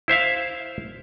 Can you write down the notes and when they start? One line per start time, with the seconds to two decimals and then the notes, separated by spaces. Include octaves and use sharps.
0.08 E4 C5 E5 F5